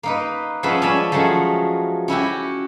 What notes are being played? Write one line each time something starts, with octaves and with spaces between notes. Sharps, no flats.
A#3 D#4 B4
F3 G#3 C#4 B4 E5 F#5
C#4 D5 G#5 A5 B5
F3 F#3 G#3 A3 F#5
C#4 E4 F#4 G4